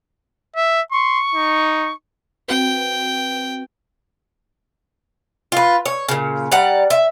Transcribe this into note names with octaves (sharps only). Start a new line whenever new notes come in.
E5
C6 C#6
D#4
C4 F#4 B4 G5
F4 B4
C#5
A#2 C#3
G3 D5 F#5 A#5
E5